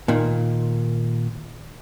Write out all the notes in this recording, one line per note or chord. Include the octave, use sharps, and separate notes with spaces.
A#2 D#3